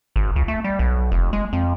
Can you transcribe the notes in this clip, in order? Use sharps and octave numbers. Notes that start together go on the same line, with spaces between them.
G#1
C#2
A3
G3
B1
F1
G#3
F2